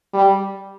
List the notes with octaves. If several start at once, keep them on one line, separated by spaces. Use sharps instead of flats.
G3